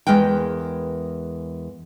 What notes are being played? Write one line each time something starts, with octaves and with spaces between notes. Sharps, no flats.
E2 G#3 A#4 B4 G5